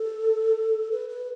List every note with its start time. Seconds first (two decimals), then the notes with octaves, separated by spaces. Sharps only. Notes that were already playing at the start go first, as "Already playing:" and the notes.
Already playing: A4
0.92 B4
1.09 B4